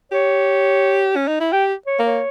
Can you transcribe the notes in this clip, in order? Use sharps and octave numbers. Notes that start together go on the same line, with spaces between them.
G4 C#5
C#4
D#4
E4
G4 G5
C#5
A#3
C#5